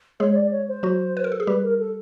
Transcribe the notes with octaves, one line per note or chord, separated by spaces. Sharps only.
G#3 G#4 C#5
C#5
D5
C#5
C5
F#3 F#4
B4
A#4
A4
G#4
G3 G4 B4
A#4
A4